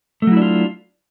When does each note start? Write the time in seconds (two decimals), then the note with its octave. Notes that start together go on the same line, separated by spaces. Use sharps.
0.22 A3
0.27 F#3
0.32 E4
0.37 D4
0.42 F4